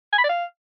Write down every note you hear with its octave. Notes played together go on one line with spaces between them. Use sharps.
G#5
B5
D5
F5